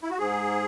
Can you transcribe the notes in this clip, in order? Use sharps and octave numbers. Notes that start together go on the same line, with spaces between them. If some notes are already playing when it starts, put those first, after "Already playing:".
E4
F#4
G#2 G#4